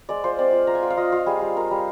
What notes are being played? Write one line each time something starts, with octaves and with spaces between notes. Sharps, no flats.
G#3 D5
F4 C5
C4 D5
F4
F4 A#5
G#5
F4 G5
F5
F4 D#5
F4 F5
G3 G#4
G3
F4 A#4
G3